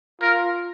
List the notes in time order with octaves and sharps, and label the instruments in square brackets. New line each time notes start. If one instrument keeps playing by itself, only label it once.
[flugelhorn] F4 [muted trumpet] A#4